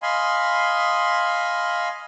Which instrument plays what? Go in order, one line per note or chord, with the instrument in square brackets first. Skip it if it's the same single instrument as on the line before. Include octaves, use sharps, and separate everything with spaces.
[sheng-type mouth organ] D#5 F5 G#5 B5 C6